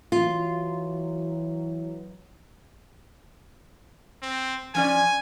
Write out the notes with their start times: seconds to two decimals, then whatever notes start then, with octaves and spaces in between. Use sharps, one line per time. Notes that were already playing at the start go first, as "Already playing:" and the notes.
0.12 E3 F#3 F4
4.22 C4
4.75 F3 C#4 D5 G#5